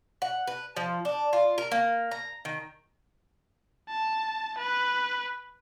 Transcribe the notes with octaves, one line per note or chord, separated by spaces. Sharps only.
F#5
B4
F3
D4
F4
A#4
A#3
A#5
D#3
A5
B4